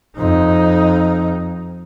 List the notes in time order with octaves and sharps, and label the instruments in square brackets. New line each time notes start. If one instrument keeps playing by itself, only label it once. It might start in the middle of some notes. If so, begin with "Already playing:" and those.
[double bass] F2 D#4